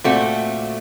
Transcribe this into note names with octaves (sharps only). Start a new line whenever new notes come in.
A#2 A3 C4 F#4